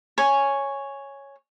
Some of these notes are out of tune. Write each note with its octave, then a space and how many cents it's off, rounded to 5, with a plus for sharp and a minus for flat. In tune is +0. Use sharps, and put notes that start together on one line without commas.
C#5 +0 G#5 +0